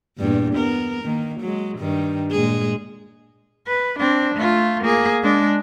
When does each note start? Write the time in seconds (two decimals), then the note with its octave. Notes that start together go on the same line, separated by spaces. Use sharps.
0.18 E2 G2 A#2
0.54 B3 A#4
1.03 D#3 A#3
1.40 F#3 G#3
1.78 G2 D#3
2.31 A#2 G#3 G#4
3.67 B4
3.99 C4 D4
4.35 A3 F4
4.83 A#3 G#4
5.22 G#3 D4